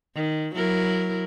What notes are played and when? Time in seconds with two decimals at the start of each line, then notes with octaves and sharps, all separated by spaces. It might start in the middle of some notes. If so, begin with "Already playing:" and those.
0.16 D#3
0.56 F#3 E4 A#4